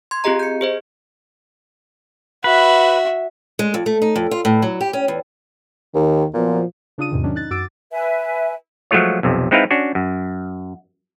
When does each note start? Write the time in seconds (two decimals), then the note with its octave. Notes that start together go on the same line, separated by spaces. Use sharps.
0.11 C6 G#6
0.24 C4 F4 G4 G#4 D#5 A#5
0.39 G6 C#7
0.61 G#4 C5 D#5
2.44 F#4 B4 E5
3.59 G#3
3.74 F2
3.86 A3
4.02 D#4
4.16 F2
4.31 F4
4.45 A2
4.62 F#3
4.81 G4
4.93 C#4
5.08 E2
5.95 D#2 D#3
6.34 A#2 F3 F#3 B3
6.98 C#3 D4 F4 D#6 D#7
7.11 E2 G#2 C3 D#3
7.24 D#3 F#3 C#4 D4
7.35 D#4 F#6 A6
7.50 F#2 F#4 D6 E6 A6 D7
7.92 B4 E5 G#5
8.91 F3 F#3 G#3 A3 F4 C#5
9.23 B1 F2 C3
9.51 G#3 C4 D#4 E4 B4 F5
9.71 C#4 D4 F#4
9.95 F#2